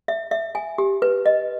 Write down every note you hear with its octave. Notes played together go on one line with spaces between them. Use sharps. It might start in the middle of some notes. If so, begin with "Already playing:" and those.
E5
E5
G#5
G4
B4
D#5